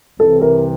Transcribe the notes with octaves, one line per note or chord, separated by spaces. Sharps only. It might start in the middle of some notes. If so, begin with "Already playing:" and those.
C2 C3 E3 A4
A#4